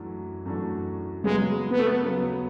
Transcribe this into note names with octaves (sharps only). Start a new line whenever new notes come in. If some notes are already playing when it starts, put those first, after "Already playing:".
Already playing: F#2 E3 A3 D4 F#4
F#2 E3 A3 D4 F#4
C#3 F#3 G#3 B3
B3
A3
B3
C#3 F#3 B3